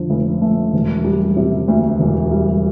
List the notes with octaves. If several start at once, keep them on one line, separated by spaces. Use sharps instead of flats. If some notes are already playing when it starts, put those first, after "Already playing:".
Already playing: F2 D3
F1
A3
E1
G3
C3
D2
E1
G3